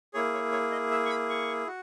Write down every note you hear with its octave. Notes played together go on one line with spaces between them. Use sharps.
A#3 E4 G#4 C#5
C#5
C#5
D#5
E5
C#6
B5
C#6
F#4